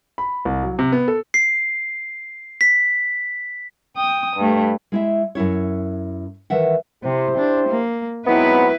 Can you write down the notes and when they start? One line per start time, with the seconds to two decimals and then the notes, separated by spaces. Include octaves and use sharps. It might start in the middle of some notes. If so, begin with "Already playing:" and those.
0.18 B5
0.45 C2
0.63 F#3
0.79 C3
0.92 B3
1.08 A4
1.34 C7
2.61 B6
3.95 G5 D#6
4.36 G2 A3
4.92 G#3 E4 E5
5.35 F#2 B2 E4 C#5
6.50 D#3 E3 E5 F#5
7.03 C3 E4 G4 C5
7.38 D4
7.68 A#3
8.27 G#2 F#3 B3 C4 E4 B4